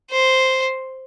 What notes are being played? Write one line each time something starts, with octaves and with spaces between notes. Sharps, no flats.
C5